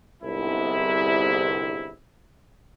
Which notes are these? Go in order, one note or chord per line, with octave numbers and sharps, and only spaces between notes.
G1 C2 G#2 E4